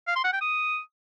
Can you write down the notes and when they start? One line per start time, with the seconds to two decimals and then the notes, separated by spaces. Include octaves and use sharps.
0.08 F5
0.16 C6
0.24 F#5
0.33 G5
0.41 D#6